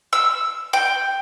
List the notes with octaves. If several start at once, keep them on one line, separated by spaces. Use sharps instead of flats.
E6
G5